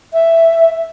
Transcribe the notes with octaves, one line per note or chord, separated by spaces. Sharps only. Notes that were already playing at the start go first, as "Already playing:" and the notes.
E5